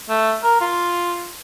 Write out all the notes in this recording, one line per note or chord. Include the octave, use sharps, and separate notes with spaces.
A3
A#4
F4